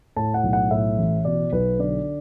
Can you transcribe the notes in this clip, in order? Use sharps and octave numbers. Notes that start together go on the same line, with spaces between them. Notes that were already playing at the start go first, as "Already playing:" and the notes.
A2 A5
F#5
B1
F#5
A2 E5
A1
B2 D5
B1 B4
D3 D5